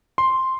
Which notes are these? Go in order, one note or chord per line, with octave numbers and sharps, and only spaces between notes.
C6